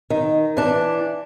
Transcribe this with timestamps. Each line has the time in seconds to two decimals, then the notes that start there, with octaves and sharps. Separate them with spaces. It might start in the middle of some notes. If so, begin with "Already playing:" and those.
0.10 D#3
0.57 E3 D4